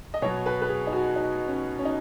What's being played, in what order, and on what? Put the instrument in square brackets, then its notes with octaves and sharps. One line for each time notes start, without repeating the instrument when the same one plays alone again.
[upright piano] D#5
B2 F#3 C#5
B4
B4
G#4
D#4
F#4
D#4
C#4
C#4
D#4